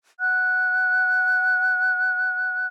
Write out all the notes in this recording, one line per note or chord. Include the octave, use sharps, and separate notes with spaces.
F#5 F#6